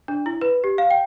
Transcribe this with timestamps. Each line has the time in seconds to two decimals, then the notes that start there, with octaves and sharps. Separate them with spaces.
0.08 D4
0.26 E4
0.41 B4
0.64 G4
0.78 F5
0.91 G5